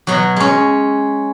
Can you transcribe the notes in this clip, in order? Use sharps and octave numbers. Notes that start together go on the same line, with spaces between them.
B2 F#3
G#3 C#4